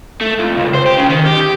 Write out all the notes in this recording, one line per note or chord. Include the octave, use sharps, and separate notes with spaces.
A3
F2
C#2
C5
G4
C#3
D#3
G4
G4